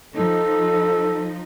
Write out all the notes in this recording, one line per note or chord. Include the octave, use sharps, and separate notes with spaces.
F3 D#4 A4